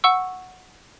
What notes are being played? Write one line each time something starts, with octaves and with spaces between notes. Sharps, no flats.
F#5 C#6 E6